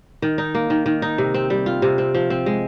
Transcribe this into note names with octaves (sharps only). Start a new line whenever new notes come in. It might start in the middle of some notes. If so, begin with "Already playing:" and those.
D#3
D#4
A#3
D#3
D#3
D#4
C3
C4
G3
F4
C3
C4
F3
C4
G#3